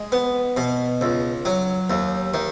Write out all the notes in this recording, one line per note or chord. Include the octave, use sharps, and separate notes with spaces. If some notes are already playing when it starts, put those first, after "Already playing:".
Already playing: G#3
B3
B2
C#2
F#3
D#2
D#3